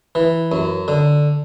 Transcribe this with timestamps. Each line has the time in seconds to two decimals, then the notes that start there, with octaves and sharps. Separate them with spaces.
0.15 E3
0.52 F#2
0.88 D3